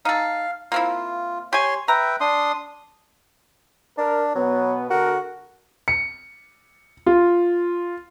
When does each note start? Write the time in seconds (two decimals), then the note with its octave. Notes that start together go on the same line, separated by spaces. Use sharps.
0.05 D#4 A4 F5
0.72 A#3 C4 E4 F4
1.53 G4 C#5 G#5 C6
1.88 B4 E5 G5 A#5
2.20 D4 C6 D#6
3.98 D4 A#4
4.35 B2 F#3 B3
4.90 D3 F#4 A4 A#4
5.88 C#7
7.06 F4